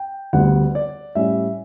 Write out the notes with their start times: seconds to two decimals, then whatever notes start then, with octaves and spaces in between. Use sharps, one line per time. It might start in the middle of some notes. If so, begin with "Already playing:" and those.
Already playing: G5
0.33 D2 D3 G3 B3 F#5
0.75 D5
1.15 A2 G3 C#4 E5